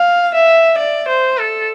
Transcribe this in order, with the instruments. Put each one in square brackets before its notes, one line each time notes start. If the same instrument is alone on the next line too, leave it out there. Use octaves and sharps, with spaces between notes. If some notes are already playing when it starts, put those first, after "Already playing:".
Already playing: [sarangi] F5
E5
D5
C5
A4